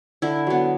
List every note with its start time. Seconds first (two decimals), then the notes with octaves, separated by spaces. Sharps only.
0.22 D3 E4
0.47 F#3 B3